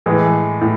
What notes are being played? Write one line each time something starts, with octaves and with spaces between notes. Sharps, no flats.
A2 E3 G#3 G#4
A2